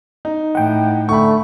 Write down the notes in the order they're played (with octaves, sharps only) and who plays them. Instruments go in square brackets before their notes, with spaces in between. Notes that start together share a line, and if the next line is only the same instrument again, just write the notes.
[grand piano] D#4
[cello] A2 [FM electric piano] F#5 G5
[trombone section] D3 A3 [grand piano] B5 C#6